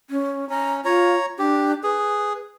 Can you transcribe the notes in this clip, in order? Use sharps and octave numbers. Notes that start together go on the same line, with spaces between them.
C#4
C#4 A#5
F4 C#5 A#5
D4 G4
G#4 B4